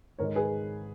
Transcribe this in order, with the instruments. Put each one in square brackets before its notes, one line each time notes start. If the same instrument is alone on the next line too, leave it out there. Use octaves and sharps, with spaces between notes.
[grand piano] G#2 D#3 G#3 [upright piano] A#4 C#5
[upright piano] G#4 B4